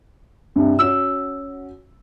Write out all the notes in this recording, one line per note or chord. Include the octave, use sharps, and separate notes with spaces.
G2 C3
C#4 F#4 E6